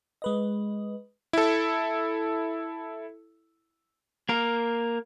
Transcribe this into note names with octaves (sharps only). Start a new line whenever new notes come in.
G#3 B4 D#5
E4 A4
A#3 A#4